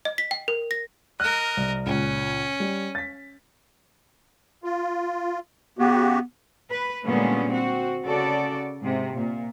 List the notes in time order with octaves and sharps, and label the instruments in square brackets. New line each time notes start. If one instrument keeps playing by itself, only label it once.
[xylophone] D#5
B6
G5
A#4
A#6
[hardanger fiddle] A#4 D#5 [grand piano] F6 F#6
[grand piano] C2
[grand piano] C#2 A#2 [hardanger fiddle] C#4
[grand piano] G3
A6 B6
[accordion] F4
[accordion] C#3 F#4 G4 [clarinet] B3
[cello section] B4
A#2 D3 G3 G#3 B3 C#4
C4 F#4
C#3 F#4 A4 D5
G#2 C3
A#2